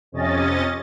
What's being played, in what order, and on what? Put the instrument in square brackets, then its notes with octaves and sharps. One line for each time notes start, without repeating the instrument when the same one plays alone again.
[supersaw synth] F2 C3 C#4 D#5 A6